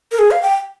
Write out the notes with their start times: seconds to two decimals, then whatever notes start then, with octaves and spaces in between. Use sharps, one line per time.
0.12 A#4
0.19 G#4
0.31 F5
0.42 G5